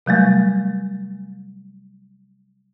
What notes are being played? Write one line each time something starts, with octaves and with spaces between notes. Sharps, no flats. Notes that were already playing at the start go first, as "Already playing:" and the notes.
C3 F#3 G3 A3